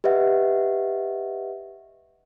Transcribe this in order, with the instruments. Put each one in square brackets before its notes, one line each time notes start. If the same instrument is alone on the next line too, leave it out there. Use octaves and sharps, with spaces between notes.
[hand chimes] G4 B4 D#5 E5 F#5